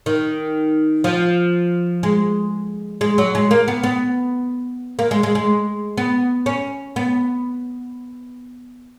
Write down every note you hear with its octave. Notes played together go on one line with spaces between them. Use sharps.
D#3
F3
G#3
G#3
F#3
G#3
A#3
B3
B3
A#3
G#3
G#3
G#3
B3
C#4
B3